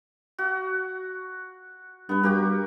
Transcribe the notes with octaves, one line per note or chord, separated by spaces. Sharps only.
F#4
G2 B3 B4
G2 F#4 G4 A#4